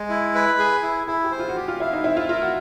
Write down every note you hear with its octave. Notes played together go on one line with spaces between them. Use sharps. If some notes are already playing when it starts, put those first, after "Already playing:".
Already playing: G#3
E4
B4
G#4
E4
E4 G#4
G4
C5
F4
F#4
F4 G4
F4
E4 F5
D#4
C4 E4
F4
F4 A#4
F#4